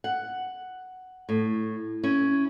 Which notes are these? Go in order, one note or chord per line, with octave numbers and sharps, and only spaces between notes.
F#5
A2
C#4 E4